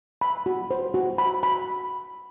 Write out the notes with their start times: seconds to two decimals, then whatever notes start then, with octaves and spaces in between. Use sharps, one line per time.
0.21 B5
0.46 F#4
0.71 C5
0.94 F#4
1.18 B5
1.43 B5